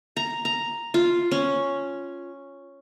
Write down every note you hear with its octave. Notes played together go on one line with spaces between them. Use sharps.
A#5
A#5
F4
C#4